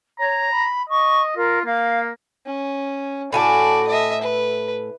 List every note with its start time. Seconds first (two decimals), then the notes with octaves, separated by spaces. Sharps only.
0.20 C#5 A#5
0.51 B5
0.89 D#5 C#6
1.36 F4 A#4
1.65 A#3 F5
2.46 C#4
3.33 A2 F#4 D5 G#5 A5
3.87 D#5 E5
4.21 B4